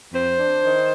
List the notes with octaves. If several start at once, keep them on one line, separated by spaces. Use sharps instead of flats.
F2 C5
D4
D#3